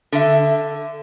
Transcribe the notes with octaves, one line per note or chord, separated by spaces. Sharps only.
D3 E5